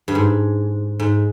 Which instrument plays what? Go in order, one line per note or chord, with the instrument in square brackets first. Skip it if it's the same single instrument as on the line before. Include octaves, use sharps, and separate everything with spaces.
[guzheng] G2
G#2
G#2